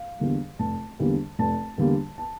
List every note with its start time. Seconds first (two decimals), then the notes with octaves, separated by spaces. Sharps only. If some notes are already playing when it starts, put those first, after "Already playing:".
Already playing: F5
0.20 E2 D3 G3 A#3
0.59 F1 A5
0.99 E2 D3 G3 A#3
1.39 F1 A5
1.78 E2 D3 G3 A#3
2.18 A5